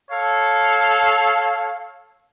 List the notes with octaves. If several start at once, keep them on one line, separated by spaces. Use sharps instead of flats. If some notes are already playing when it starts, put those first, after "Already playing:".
A4 C#5 F5